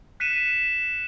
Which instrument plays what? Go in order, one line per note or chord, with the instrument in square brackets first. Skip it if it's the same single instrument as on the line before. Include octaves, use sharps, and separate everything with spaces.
[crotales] F#6 B6 C#7 D#7 E7